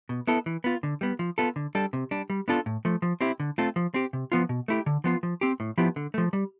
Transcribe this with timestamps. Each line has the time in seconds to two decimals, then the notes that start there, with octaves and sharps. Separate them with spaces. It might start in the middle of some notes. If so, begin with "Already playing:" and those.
0.09 B2
0.27 B3 E4 A4
0.46 E3
0.64 B3 F4
0.83 D3
1.01 G3 B3
1.19 F3
1.38 B3 F4 A4
1.56 D3
1.75 G3 D4 A4
1.93 C3
2.11 G3 D4
2.30 G3
2.48 B3 D4 F4 A4
2.66 A2
2.85 F3 A3
3.02 F3
3.21 C4 E4 G4
3.40 D3
3.58 A3 C4 F4 A4
3.76 F3
3.94 C4 G4
4.13 C3
4.32 F3 B3 F4
4.49 B2
4.68 A3 E4 G4
4.86 D3
5.04 F3 B3 F4
5.23 F3
5.41 C4 G4
5.60 A2
5.78 F3 B3 E4 G4
5.96 D3
6.14 F3 A3
6.33 G3